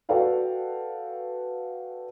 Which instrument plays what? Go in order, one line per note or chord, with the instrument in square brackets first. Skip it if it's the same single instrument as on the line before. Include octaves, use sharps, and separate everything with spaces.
[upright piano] F#4 A4 B4 D5 F5 G5